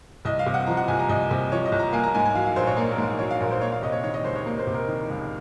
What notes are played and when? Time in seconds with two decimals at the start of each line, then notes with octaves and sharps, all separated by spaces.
0.25 C2 D#5
0.39 F5
0.46 C3
0.54 F#5
0.67 F3 A#5
0.77 F#5
0.88 C2 G#5
0.99 A#5
1.09 C2 D#5
1.31 C3
1.51 F3 C#5
1.65 D#5
1.72 C2
1.79 A#5
1.93 A#3 G#5
2.03 A#5
2.15 G#2 G#5
2.25 G#5
2.35 F#3 F5
2.46 F5
2.56 A#1 C5
2.67 C#5
2.77 A#3 C#5
2.92 A#4
2.98 G#2
3.19 F#3 C#5
3.31 F5
3.40 A#1 A#4
3.51 C5
3.61 A#3 C#5
3.72 F5
3.83 C3 D#5
3.92 C#5
4.03 D#3 C#5
4.14 D#5
4.24 C#2 C5
4.35 C#5
4.46 A#3
4.59 C5
4.67 C3
4.74 A#4
4.88 D#3
5.09 C#2